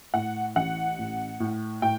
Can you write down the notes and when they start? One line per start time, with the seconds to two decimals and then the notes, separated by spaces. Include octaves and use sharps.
0.14 A2 F#5
0.56 A1 F#5
0.99 A2
1.40 A2
1.82 A2 G5